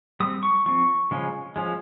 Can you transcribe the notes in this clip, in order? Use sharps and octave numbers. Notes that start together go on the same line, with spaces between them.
G3 C4 D#6
C#6
F3 C4 C#6
C#3 F3 G#3 C#4
F3 G#3 C#4